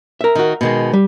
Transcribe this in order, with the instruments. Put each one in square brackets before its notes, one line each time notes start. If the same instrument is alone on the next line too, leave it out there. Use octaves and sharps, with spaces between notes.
[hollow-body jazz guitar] A#4 E5
[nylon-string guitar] D#3 F#4
B2 D#3 G#3
[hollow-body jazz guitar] G3